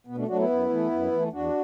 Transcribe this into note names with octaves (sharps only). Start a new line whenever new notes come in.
B2 B3
A3 D4
F#3 A3 D4 F#4
B3 E4
F#2
E3 A3
F#2
E3 A3
E2 D4 F#4